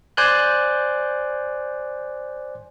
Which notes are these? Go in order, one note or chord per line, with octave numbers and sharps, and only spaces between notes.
C5 D5 G#5 F#6 G6